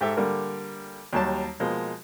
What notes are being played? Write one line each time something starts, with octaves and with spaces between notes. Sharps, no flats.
G#2 G4 A4 E5
D3 G3 A#3 A#4
D#2 F#3 G3 A5
B2 F3 G#3 A#3